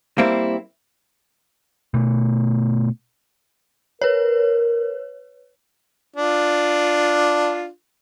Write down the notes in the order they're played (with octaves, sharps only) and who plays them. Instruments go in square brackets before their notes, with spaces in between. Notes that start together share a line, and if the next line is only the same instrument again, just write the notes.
[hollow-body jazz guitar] G3 A#3 C4 E4
[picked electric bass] B2 A3
[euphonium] A#4 [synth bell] B4 C#5
[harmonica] D4 F4